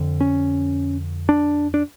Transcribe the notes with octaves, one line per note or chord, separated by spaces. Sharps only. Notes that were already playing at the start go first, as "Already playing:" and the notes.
Already playing: F2 D3
C#4
D4
D4